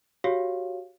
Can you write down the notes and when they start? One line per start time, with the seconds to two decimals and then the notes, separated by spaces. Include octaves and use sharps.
0.24 F#4 G4 C#5 F5